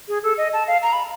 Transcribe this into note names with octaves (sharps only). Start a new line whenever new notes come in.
G#4
A4
D#5
A5
F5
A#5
B5